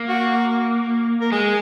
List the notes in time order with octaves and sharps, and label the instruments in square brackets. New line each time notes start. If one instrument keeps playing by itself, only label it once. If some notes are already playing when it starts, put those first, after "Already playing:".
Already playing: [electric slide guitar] A#3
[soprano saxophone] F#4
A#4
[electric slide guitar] G#3 [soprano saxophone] G#4